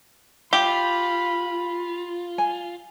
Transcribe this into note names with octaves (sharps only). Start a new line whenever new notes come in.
F4 G4 B5
G#5